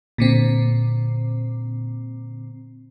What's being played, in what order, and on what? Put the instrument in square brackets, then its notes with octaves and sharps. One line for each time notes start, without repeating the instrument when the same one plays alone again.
[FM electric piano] A#2 D3 C4